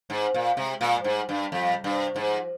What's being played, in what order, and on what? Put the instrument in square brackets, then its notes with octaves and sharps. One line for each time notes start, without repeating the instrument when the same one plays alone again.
[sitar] G#2 [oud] C4
[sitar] A#2 [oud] A#3
[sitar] C3 [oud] G#3
[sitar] A#2
[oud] F3
[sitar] G#2 [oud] G3
[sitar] G2
[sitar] F2 [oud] G3
[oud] C#3
[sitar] G2 [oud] C3
[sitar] G#2 [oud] F3